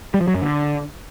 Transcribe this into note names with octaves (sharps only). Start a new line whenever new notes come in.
G3
F3
F#3
F#2
D3